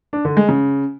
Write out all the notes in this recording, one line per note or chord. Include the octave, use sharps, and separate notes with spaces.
D4
D3
G#3
C#3